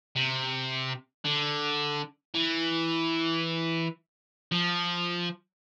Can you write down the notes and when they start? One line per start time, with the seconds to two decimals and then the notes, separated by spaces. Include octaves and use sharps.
0.16 C3
1.24 D3
2.35 E3
4.52 F3